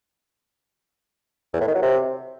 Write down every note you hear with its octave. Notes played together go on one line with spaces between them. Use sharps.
E2
A2
D#3
F#3
C3